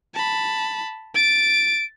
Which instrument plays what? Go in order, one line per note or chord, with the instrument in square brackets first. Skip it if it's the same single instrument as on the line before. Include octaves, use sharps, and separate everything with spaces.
[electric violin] A5 B5
[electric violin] A6 [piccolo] D7